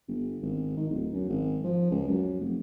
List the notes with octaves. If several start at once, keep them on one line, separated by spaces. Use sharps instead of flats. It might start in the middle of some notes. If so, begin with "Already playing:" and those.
G1
G#1
D#3
D1
F#2
G#1
F3
C#2
F#2
F1